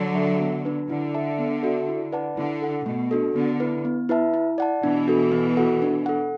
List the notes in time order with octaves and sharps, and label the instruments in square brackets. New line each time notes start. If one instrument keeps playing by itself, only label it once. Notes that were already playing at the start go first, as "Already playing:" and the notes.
Already playing: [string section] D3 F#3
[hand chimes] A4 E5
B3
D4 B4
[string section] D3 [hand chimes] E4
[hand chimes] A4 E5 A5
B3
F#4 A4 E5
E4
B4 D5 F#5 A5
[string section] D3 [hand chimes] E4
[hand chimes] A4 F#5
[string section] B2 [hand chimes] A3
[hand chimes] D4 F#4 A4
[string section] D3 [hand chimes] B3
[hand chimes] E4 B4
B3
E4 B4 E5 A5
E4
D5 F#5 A5
[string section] B2 E3 [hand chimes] D4
[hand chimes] F#4 A4
B3
F#4 A4 F#5
D4
A4 F#5